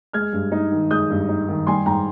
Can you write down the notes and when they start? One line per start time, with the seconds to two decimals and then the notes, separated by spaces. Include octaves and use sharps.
0.13 G#3 F6 G#6
0.33 G2
0.52 D#4
0.72 D#3
0.91 G#3 D#6 G6
1.10 G2
1.29 D#4
1.48 D#3
1.67 G3 G#5 C6
1.86 G#2 G5 A#5